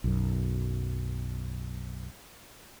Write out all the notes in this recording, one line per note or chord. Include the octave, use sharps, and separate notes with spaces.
B1 F#2